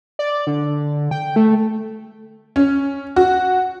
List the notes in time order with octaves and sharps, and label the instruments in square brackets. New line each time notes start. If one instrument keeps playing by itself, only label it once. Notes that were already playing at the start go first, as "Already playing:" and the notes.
[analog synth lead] D5
D3
G5
A3
[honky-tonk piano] C#4
F#4